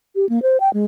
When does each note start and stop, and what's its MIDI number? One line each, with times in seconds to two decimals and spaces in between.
0.16 0.28 67
0.29 0.39 58
0.43 0.57 72
0.60 0.72 79
0.74 0.85 56